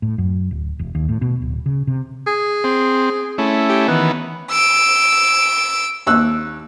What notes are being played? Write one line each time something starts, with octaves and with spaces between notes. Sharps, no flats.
A2
F#2
D1
E1
D#2
A2
B2
D1
C#3
C3
G#4
C4
A3 C#4 E4
G4
D#3 E3 B3 B4
E6 D7
D#2 E6 F#6